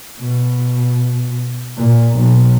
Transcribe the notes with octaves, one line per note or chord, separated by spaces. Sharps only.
B2
A#2
B1